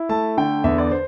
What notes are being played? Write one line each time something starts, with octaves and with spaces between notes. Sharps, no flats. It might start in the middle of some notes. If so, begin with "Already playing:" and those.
Already playing: E4
A3 A5
D3 G5
E2 E5
D5
C5